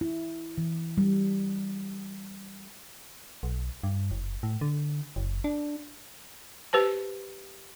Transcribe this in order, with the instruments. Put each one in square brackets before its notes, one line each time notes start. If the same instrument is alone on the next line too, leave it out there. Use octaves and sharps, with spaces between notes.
[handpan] E4
E3
G3
[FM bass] B1
G2
F#1
A2
D3
F#1
D4
[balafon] G4 B4 C5 A5